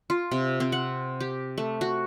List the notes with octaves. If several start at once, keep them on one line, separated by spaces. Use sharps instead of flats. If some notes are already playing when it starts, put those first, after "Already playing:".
F4
C3
C4
F#5
G4
A3
F#4